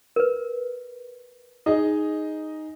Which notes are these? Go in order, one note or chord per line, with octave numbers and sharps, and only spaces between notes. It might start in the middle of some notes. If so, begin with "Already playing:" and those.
A#4 B4
D#4 G#4 D#5